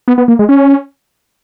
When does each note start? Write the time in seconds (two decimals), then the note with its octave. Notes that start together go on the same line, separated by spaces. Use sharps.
0.08 B3
0.18 B3
0.28 A#3
0.39 G#3
0.49 C#4